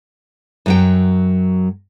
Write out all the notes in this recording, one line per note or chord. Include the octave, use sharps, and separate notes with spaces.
F#2 F#3 G5